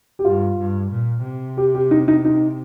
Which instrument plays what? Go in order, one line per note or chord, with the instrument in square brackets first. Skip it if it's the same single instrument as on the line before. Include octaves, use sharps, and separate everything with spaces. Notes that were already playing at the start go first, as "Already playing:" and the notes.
[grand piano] G4
[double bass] G2 [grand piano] F4
[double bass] G2
A#2
C3
[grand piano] G4
G4
D#4
D#4
D#4